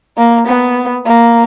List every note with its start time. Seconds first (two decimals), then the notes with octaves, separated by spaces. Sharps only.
0.18 A#3
0.47 B3
1.06 A#3